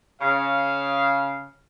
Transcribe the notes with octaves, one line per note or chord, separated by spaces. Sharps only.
C#3 F5